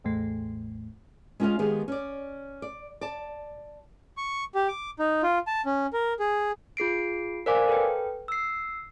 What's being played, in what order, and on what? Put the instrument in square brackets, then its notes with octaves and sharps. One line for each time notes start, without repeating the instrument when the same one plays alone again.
[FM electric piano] A1 E2 A2 A3
[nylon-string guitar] G#3 C#4 F4 D5 D#5 F5
D#3 G#3 B3 G4 G#4 F5
C#4 D5
D5
D5 A5
[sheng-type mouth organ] C#6
G4
D6
D#4
F4
A5
C#4
A#4
G#4
[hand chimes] F4 G#4 C7 D7
A#4 C5 D5 F5 G#5 D6
A4 B4 G5
E6 C7